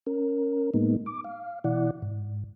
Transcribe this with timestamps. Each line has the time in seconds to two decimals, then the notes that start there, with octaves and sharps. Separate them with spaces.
0.06 C#4 A#4
0.74 A2 G#3 A#3 B3 D#4
1.06 D6
1.24 F5
1.64 B2 E3 E4 D5 F#5
2.02 G#2